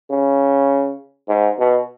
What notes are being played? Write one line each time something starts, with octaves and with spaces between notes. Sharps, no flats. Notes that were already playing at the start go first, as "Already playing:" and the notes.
C#3
G#2
B2